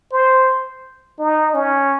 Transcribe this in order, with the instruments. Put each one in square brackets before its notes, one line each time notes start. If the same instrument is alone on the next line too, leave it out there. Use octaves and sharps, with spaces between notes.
[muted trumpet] C5
D#4
C#4